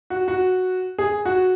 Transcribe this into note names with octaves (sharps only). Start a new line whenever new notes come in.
F#4
F#4
G#4
F#4